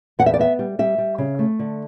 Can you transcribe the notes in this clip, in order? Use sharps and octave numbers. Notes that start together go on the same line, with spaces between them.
E2 F#5
E5
D5
B3 E5
G3
G3 E5
G3
C#3
A3
D3